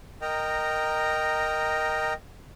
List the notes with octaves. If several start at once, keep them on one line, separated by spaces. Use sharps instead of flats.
A#4 D#5 G5 A#5